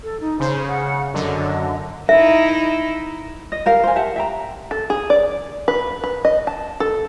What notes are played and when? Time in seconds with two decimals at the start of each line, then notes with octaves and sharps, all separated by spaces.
0.03 A4
0.20 D#4
0.40 C#3 C5
0.68 F#5
1.14 F#2 D3 D#5
2.09 D#4 E4 E5
3.52 D#5
3.66 G4 A#4 F5
3.84 C5 G#5
3.96 G4 E5 F#5 A5
4.16 E5 G5 A#5
4.71 A4
4.90 G#4
5.10 D5
5.68 B4
6.04 B4
6.25 D#5
6.47 A5
6.80 A4